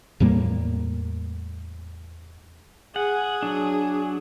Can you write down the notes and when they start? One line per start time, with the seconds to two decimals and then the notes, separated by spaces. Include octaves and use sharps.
0.20 E2 A2 G3 A#3
2.96 G#4 F#5
3.43 F#3 D4